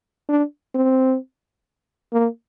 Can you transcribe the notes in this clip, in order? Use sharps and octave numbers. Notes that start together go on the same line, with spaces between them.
D4
C4
A#3